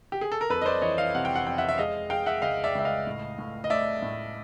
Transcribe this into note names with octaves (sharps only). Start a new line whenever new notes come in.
G4
G#4
A4
A#4
F2 A4 B4
D#5
C5 D5
E3 C#5 D#5
D#5 F5
C3 F#5
G5
F#5
F2 G5
E5 F#5
E5
G#3 D#5 F5
G#3 F5 G5
E5 F#5
C#2 D#5 F5
D5 E5
C#2 E5
D#5 F5
A2
A2
D#5
A3 D5 E5
A2